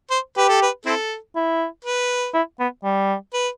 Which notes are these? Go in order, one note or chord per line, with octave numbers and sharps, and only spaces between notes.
C5
G4 B4
A4
B4
C4 E4 A4
E4
B4
E4
B3
G3
B4